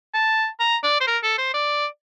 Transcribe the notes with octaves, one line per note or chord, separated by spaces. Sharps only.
A5
A#5
D5
C5
A#4
A4
C5
D5